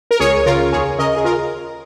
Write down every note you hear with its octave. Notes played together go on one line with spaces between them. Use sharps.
A#4
C#2 G#4 C#5
C#3 F4 A#4
D#2 G#4 C#5
C#3 A#4 D#5
G#4
F4 A#4